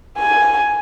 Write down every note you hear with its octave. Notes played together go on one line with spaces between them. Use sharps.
G#5